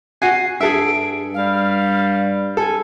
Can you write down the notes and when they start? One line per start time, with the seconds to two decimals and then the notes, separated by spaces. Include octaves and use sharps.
0.22 F#4 F#5 G#5 C7
0.61 G2 G#4 A4 E5 D7
1.34 G3 F5
2.57 A4 G#5